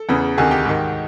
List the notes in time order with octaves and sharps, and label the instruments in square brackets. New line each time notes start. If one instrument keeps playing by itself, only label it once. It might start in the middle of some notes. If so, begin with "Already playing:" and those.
Already playing: [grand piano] A4
E2 C#3 E3
D2 C3 D#3 G#4 G#5
G4 G5
G#2 D#3